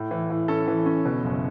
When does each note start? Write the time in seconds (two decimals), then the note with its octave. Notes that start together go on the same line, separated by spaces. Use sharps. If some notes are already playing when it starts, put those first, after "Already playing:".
Already playing: A2
0.11 E3
0.30 A2
0.48 C#4 A4
0.68 E3
0.86 C#4
1.05 B2
1.24 F#1